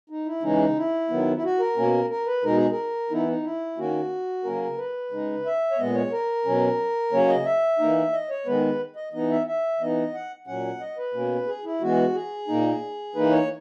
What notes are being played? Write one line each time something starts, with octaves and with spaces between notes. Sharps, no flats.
D#4
E4
C#3 E3 G#3 C#4 D#4
E4
D#3 F#3 B3
E4
F#4
A#4
B2 A#3 C#4
A#4
B4
B2 G#3 D#4 A#4
G#4
A#4
E3 B3 D#4 E4
D#4
E4
D#3 A#3 C#4 F#4
C#3 F#3 A#3 C#4 A#4
B4
C#3 G#3 D#4
E5
C#5
A#2 G#3 B3 D#5
C#5
A#4
B2 F#3 C#4
C#3 F#3 A#3 C#4 C#5
D#5
E5
E3 A#3 D#4
D#5
C#5
D#3 G#3 B3 B4
D#5
E3 B3 D#4 D#5
E5
E5
E3 B3 D#4 D#5
F#5
A#2 F#3 C#4 F#5
D#5
B4
B2 A#3 C#4
G#4
E4
E3 G#3 B3 F#4
G#4
A#2 A#3 D#4
E3 A#3 D#4 B4
C#5